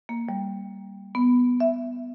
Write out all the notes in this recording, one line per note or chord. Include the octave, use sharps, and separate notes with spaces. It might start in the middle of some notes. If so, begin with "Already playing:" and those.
A#3
G3
B3
E5